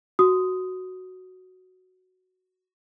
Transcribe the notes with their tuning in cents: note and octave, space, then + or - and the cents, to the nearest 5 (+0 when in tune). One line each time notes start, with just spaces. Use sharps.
F#4 +0 D#6 +0